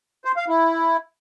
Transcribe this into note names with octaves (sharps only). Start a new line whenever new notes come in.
C5
F5
E4